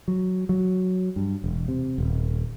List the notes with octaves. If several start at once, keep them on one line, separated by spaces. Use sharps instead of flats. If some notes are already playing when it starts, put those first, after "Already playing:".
F#3
F#3
G2
E1
C3
D#1